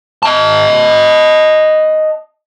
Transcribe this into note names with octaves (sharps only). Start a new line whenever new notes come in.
D#5 A5